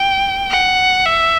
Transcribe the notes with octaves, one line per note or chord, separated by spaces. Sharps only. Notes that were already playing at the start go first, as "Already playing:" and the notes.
Already playing: G5
F#5
E5